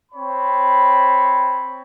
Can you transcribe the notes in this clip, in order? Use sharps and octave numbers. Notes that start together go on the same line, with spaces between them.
C4 C#5 B5